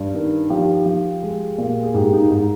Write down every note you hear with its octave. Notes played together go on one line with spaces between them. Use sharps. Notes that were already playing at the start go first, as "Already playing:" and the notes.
Already playing: G2
D#3
F3 G4
F3
G#3
A#2
G#4
G#2 G4
D#4
G#2